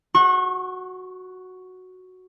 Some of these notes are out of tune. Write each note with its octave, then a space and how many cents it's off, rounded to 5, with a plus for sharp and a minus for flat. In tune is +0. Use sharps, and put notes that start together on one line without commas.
F#4 +0 C#6 -35